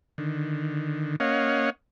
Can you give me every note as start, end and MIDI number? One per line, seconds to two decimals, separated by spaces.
0.18 1.16 50
0.18 1.16 51
1.20 1.70 58
1.20 1.70 61
1.20 1.70 73
1.20 1.70 75
1.20 1.70 77
1.20 1.70 78